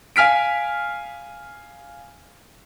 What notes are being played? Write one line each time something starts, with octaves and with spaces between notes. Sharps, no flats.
F5 G#5 F6 B6 D7